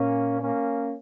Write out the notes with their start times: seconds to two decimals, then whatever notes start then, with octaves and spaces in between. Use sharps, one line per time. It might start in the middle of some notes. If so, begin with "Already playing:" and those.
Already playing: A#2 A#3 C#4
0.40 A#3 C#4